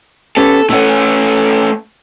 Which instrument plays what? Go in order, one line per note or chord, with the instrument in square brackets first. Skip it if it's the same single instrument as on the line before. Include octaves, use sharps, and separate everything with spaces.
[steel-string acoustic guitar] B3 C#4 G4 [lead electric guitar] A4
[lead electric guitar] A3 C#4 [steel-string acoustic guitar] A4 F#5